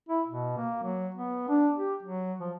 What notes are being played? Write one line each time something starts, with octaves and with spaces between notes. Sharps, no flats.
E4
B2
A#3
F#3
B3
D4
G4
F#3
F3